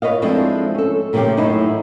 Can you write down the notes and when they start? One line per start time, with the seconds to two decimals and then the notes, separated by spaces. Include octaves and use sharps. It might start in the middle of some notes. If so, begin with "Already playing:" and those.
0.02 F4 B4 C#5 D#5 F5
0.22 F3 G#3 C4 D4 E4 A4
0.75 C#4 A4
1.13 A#2 C#3 F3 A3 G4
1.37 F#2 A2 E3 D#4 E4